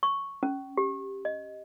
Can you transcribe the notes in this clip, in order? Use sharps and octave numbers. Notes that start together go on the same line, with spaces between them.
C#6
C#4
G4
D#5